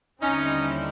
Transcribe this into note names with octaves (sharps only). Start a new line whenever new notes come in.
D#2 D3 G3 C4 C#4 D#4 E4